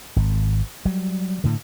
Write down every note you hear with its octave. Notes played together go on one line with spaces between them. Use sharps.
G#1
F#3 G3
A2 D3